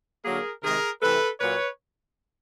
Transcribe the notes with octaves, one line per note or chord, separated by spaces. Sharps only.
D3 F#3 A#3 G#4 A#4
C3 D#3 G#3 G#4 A#4
C3 E3 A3 A4 B4
A#2 F#3 A#3 B4 C#5